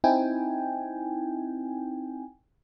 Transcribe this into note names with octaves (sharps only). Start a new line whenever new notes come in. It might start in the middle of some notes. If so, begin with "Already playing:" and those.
C4 D#4 E4 G5 G#5